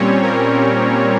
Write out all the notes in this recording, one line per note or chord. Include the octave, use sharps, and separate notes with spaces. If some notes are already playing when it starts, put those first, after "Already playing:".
Already playing: A#2 G3 C4 C#4 C#5
A#4